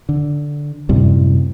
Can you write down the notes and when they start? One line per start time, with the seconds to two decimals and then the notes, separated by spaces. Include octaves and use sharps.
0.09 D3
0.89 F#2 A2 C3 G3